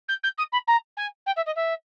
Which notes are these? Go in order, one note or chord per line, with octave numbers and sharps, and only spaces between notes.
G6
G6
D#6
B5
A#5
G#5
G5
E5
D#5
E5